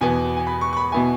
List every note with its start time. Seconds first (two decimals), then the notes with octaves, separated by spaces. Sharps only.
0.01 E2 B2 B3 G#5
0.37 G#5
0.47 B5
0.61 C#6
0.73 C#6
0.77 B5
0.92 B2 B3 E4 G#5